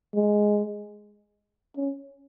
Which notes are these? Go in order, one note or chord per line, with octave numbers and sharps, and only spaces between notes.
G#3
C#4